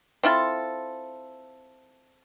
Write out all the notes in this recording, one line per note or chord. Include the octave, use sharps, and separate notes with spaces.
C4 E4 F4 A4